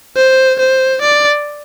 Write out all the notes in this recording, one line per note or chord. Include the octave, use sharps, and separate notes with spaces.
C5
C5
D5